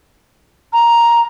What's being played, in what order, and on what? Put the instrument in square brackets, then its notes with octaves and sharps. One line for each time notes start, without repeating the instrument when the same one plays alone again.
[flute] A#5